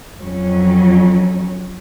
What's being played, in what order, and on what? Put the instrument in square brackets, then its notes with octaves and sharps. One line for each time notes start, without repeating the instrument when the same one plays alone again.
[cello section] F2 F#3 C#4